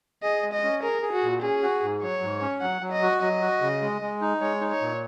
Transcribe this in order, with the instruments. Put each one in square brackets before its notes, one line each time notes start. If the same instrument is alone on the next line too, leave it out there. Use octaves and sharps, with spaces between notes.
[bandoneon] G#4 [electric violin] D#5
[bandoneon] G#3
[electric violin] D#5
[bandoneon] C#4
[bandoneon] G#4 [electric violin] A#4
[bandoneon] G#4
[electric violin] F#4
[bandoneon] A#2
[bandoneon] C#4 [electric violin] G#4
[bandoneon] F#4
G#2
[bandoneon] F#3 [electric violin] C#5
[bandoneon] G#2
C#4
[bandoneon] F#3 [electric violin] F#5
[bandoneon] F#3
[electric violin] D#5
[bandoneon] F#4
[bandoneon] F#3 [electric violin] D#5
[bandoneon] F#4
C#3
G#3
G#3
D#4
[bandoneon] G#3 [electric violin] C#5
[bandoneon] D#4
[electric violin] C#5
[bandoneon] A#2